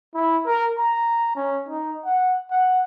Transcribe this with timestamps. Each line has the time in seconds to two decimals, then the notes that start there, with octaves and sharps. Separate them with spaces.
0.14 E4
0.46 A#4
0.78 A#5
1.36 C#4
1.69 D#4
2.05 F#5
2.51 F#5